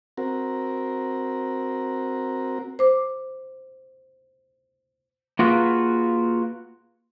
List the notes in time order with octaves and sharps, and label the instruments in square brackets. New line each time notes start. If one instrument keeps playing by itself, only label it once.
[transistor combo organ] C4 F#4 A#4
[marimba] C5 D6
[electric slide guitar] A#3 F4 F#4 G#4 B4